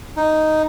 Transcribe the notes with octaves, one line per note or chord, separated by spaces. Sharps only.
D#4